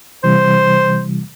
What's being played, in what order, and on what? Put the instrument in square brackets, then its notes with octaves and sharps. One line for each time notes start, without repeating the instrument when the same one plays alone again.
[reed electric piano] C3 E3 G3 [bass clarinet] C5